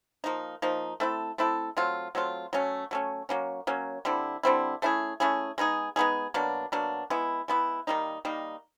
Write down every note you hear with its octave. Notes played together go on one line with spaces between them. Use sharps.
F3 A#3 D#4
F3 A#3 D#4
A3 C4 E4 A4
A3 C4 E4 A4
F#3 A3 C4 F4
F#3 A3 C4 F4
F#3 A3 C#4
F#3 A3 C#4
F#3 A#3 C#4
F#3 A#3 C#4
D3 G3 C4 E4
D3 G3 C4 E4
A3 C#4 E4 G#4
A3 C#4 E4 G#4
G#3 B3 D#4 G#4
G#3 B3 D#4 G#4
B2 F#3 A#3 D4
B2 F#3 A#3 D4
G#3 B3 E4
G#3 B3 E4
D#3 G3 A#3 D#4
D#3 G3 A#3 D#4